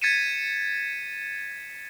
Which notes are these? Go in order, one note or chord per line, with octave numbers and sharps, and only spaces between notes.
G#6 A6 B6 C#7 D#7 E7